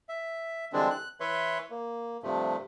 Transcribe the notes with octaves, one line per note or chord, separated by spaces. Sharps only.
E5
D3 E3 G3 G#3 C4 D4
F#6
E3 B4 C#5 E5 C6
A#3
G2 C3 F3 A3